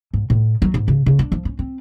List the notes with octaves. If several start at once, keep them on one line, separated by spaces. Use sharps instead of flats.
G#2
A2
F#3
G#2
C#3
C#3
D4
F3
C#4
C4